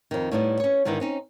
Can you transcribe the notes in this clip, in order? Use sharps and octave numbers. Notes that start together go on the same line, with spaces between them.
F2 D#3
A2 G3 B3 D#4 E4
C#4 C#5
G#2 D3 D#3 B3 D#4 E4
C4 C#4 D#4